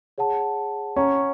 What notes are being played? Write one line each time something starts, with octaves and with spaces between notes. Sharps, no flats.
G#4 C#5 F#5 A5
C#4 C#5 F#5 A#5 C#6